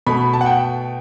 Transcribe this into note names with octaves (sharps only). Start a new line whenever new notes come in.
B2 A3 B5
A5
F#5
G5